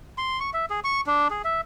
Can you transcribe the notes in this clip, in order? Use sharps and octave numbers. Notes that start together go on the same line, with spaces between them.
C6
C#6
E5
G#4
C#6
D4
G#4
E5